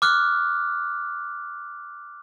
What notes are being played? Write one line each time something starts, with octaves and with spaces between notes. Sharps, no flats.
D6 F6 F#6